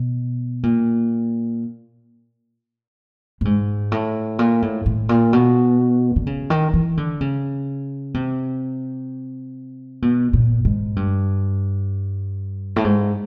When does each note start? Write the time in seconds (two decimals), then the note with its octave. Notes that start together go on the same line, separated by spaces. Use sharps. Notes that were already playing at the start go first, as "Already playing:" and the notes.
Already playing: B2
0.63 A#2
3.41 A2
3.45 G#2
3.92 A2
4.39 A#2
4.62 A2
4.86 A2
5.09 A#2
5.33 B2
6.16 D3
6.27 C#3
6.50 D#3
6.74 E3
6.97 D3
7.21 C#3
8.14 C3
10.02 B2
10.33 A#2
10.65 G#2
10.96 G2
12.76 A2
12.84 G#2